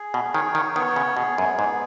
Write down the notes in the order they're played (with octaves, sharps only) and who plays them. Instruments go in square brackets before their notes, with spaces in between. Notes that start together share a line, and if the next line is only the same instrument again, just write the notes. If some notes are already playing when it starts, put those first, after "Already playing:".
Already playing: [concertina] G#4
[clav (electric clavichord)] B2
[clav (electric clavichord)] D#3 [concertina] C#5
[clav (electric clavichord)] D#3
[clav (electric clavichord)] D#3 [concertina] B3
[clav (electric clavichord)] C#3
[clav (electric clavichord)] B2 [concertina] G#4
[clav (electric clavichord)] F#2
[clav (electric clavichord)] G#2 [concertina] B3